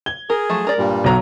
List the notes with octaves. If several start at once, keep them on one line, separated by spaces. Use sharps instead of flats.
G#6 G7
G#4 A#4
F3 F#3 A3
G#3 A#4 D5
G2 A#2 G3
B1 F#3 A#5